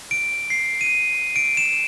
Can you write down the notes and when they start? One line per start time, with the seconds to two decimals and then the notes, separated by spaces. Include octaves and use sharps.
0.11 D7
0.50 C7
0.81 D#7
1.36 D7
1.57 E7